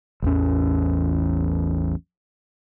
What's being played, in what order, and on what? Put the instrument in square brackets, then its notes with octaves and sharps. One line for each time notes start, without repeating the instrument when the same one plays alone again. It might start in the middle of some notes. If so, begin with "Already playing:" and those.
[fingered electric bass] A1 E2 C#4